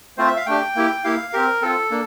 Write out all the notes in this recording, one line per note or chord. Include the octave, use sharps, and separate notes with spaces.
A3 C4 F4 C5
E5
F5
A3 D4 G4 G5
A#3 E4 G4
A#3 E4 G4 F5
C4 G4 A#4
C4 F4 A4
A#3 D4